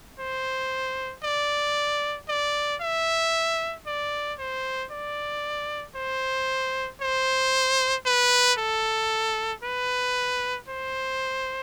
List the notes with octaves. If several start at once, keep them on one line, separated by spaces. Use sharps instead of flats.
C5
D5
D5
E5
D5
C5
D5
C5
C5
B4
A4
B4
C5